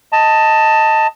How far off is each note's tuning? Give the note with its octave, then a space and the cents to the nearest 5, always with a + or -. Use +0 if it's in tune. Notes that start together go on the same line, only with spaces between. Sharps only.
D#5 +15 A5 +15